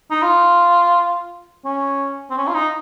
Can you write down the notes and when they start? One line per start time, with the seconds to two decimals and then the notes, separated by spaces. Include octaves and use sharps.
0.10 D#4
0.22 F4
1.65 C#4
2.30 C4
2.37 C#4
2.47 F4
2.54 D#4